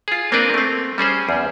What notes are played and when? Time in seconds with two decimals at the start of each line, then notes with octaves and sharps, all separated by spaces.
0.08 F4 G#4
0.32 A#3 C4 D4 A#4 B4
0.54 A3 C4
0.98 G3 C#4 G#4 C5
1.29 E2